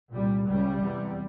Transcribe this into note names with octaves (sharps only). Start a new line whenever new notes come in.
C2 A#2 G3
C#2 C#3 G3
E2 C3